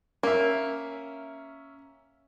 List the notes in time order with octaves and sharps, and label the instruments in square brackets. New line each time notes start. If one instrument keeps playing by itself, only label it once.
[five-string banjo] A#3 [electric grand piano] C#4 E5